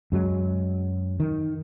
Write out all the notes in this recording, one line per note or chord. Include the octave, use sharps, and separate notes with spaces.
F#2 F#3 G#3
D#3